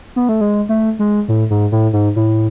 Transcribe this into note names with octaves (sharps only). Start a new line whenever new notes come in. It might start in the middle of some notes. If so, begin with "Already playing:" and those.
B3
A3
G#3
A3
G#3
A2
G#2
A2
G#2
A2